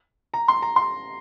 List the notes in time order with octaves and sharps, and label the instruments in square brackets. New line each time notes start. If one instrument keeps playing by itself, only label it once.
[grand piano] A#5
C6
A#5
C6